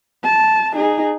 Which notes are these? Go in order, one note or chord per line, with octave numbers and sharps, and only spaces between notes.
A5
D#4 G#4